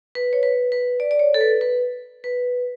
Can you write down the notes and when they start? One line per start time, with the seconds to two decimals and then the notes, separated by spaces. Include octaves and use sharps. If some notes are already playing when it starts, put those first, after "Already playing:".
0.15 B4
0.33 C#5
0.43 B4
0.72 B4
1.00 D5
1.11 D5
1.19 C#5
1.34 A4
1.41 B4
1.61 B4
2.24 B4